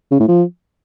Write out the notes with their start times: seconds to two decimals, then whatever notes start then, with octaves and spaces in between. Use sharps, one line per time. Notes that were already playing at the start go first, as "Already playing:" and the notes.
0.11 C#3
0.20 A2
0.28 F3